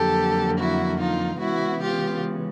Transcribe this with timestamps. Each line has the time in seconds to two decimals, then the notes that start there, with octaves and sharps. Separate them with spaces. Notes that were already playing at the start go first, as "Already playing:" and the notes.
Already playing: F2 D3 F#3 A#3 G4 A4
0.58 E4 F#4
0.99 D#4 F4
1.39 C#3 E3 G#3 B3 E4 F#4
1.80 F4 G4